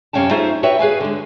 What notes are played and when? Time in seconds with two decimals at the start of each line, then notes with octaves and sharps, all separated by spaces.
0.13 F#2 C3 C#4 F5 G5 A5
0.31 A3 D#4 F4 G#4 C5 E5
0.63 F#4 B4 C#5 E5 G5
0.79 G#4 B4 F5 G#5
1.00 D3 G#3